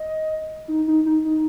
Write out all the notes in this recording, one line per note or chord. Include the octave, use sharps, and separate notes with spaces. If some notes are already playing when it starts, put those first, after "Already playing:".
Already playing: D#5
D#4
D#4
D#4
D#4